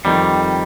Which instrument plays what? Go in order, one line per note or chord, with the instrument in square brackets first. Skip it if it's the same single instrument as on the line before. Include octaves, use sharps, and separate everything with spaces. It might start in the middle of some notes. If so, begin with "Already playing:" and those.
[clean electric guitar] F2 D#3 G3